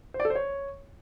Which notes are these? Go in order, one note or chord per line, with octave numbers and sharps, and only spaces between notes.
C5
D5
A4
C5
C#5